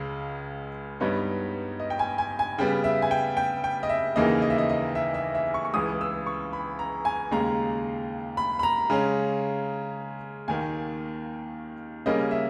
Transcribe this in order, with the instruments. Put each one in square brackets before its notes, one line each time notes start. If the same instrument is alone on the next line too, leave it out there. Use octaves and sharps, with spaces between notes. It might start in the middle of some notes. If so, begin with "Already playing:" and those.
Already playing: [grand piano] C#2 C#3 G#3
G2 G3 B3 D#4 C#5
D#5
G5
G#5
G#5
G#5
C#3 G3 B3 G5
E5
G#5
G5
G5
G5
D#5
E5
D#2 C#3 E3 A#3 D#4 D#5
D#5
E5
D#5
D#5
E5
E5
E5
C#6
C#6
C#2 C#3 E3 D#6
E6
C#6
B5
A#5
G#5
D#2 C#3 G#3 A#5
B5
B5
A#5
C#3 G#3 C#4
D#2 D#3 A#3 G#5
C#3 G3 A#3 C#4 D#5
E5